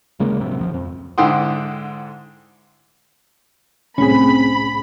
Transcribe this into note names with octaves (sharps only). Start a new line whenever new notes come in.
D#1 C#3 G#3 A#3
A#1 F#2 C3
D1 F3
F2
G#2 D3 E4 G5 C6 D#6
C2 A2 C4 C#4 G#4 B5